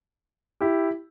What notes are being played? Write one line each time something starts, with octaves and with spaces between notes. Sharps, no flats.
E4 G4